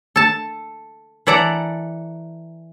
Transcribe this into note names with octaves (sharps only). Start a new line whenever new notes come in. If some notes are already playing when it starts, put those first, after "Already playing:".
A4 A5
E3 A4 D5 F#5 A#5